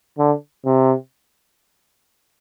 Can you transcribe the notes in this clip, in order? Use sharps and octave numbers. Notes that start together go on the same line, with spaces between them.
D3
C3